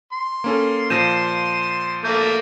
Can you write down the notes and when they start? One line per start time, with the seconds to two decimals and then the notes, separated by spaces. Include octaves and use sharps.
0.13 C6
0.44 A#3 C#4 A4
0.90 A#2 F3 G6 A#6 D#7 E7
2.04 A3 A#3 G6